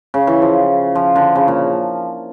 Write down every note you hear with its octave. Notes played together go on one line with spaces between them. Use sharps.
C#3
E3
F3
F3
D3
C#3
A#2